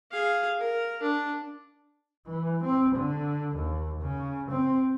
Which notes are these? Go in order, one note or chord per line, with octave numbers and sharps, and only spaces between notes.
G#4 F5
A#4
D4
E3
C4
D3
D#2
C#3
C4